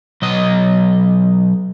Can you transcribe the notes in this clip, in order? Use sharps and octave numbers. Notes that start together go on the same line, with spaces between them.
B1 D#5